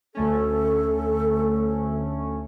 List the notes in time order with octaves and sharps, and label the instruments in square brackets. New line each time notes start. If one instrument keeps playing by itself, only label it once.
[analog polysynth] D2 A3 C#4 [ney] A4